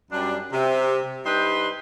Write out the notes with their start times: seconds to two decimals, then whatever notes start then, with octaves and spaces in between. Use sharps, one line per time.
0.11 F#2 G3 D4
0.52 C3
1.24 G3 D4 D#4 B4 C5 C6